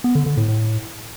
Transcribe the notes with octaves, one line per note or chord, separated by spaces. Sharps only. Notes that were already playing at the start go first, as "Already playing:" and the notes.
B3
D3
D3
A2
A2